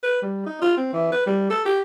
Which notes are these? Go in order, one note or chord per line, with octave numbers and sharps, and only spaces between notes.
B4
G3
D#4
F4
C4
E3
B4
G3
A4
G4